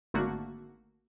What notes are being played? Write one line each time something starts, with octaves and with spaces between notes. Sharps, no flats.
G#1 D3 A3 A#3 F#4